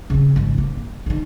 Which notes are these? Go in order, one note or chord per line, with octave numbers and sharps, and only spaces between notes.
C#3 C4
G#1 F2
A#3
D3 D#3